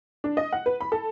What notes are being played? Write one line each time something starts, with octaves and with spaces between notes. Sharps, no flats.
D4
D#5
F#5
B4
B5
A4